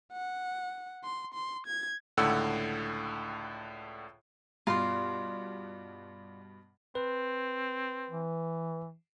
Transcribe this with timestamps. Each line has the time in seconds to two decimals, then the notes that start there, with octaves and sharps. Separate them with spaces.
0.13 F#5
1.04 C6
1.34 C6
1.67 G#6
2.17 C#2 A2 D3 F#5 E6
4.67 G2 B2 F4 D5 C6
6.95 C4 B4
8.10 E3